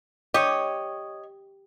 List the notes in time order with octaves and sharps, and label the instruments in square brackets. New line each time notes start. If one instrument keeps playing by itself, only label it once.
[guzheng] G4 [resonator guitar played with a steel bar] C#5 D#5